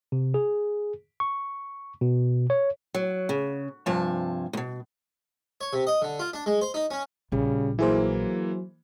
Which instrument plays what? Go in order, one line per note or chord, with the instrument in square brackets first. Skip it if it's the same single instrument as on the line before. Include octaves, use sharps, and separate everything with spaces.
[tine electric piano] C3
G#4
C#6
B2
C#5
[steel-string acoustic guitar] F#3
C#3
G2 C3 F3 G#5 A5
D2 B2
[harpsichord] C#5
C3
D#5
D3
F4
D4
G#3
C5
D#4
C#4
[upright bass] A#1 [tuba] C#3 [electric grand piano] G3
[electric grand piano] E3 A#3 [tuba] F#3 [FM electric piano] E4 G#4 C5